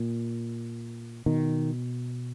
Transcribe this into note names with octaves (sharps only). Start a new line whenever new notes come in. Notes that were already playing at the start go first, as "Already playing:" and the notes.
Already playing: A#2
B2 D#3